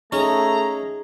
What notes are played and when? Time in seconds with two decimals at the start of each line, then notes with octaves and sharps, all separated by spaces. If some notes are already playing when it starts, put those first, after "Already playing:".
0.12 A3 C#4 D#4 G#4 A#5